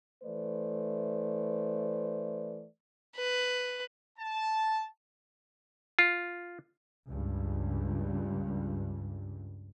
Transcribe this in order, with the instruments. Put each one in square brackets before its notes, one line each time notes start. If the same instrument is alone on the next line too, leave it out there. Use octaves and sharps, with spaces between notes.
[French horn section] E3 A3 B4 C5 D5
[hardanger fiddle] B4
[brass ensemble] A5
[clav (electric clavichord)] F4
[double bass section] C#2 G2